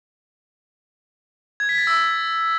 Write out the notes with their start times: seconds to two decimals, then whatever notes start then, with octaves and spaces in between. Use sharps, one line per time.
1.60 G#6
1.69 B6
1.78 A6
1.87 E6